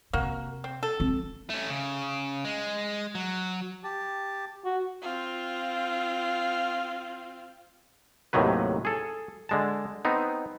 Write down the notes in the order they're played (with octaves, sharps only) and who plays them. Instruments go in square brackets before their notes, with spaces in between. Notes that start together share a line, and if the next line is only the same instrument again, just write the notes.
[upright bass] C3 [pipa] A#3 F#4
[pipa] C4
A4
[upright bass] C4
[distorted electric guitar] A3 C#4
C#3
G#3
F#3
[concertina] G4 A5
[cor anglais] F#4
[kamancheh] C4 F4
[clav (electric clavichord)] D#2 A2 C3 D#3 F#3 B4
G#4 A4
D3 G#3 A5
B3 C4 D#4